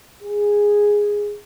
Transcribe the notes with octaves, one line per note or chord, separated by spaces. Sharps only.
G#4